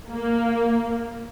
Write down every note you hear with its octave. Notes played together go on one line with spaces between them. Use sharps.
A#3